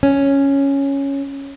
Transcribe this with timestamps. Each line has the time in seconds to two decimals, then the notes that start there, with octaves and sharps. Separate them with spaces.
0.03 C#4